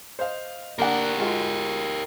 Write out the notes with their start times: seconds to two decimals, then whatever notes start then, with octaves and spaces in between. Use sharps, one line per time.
0.19 C5 D#5 F5
0.79 A#3 D4 G4 A#4 F#5
1.18 G#3 F4 F#4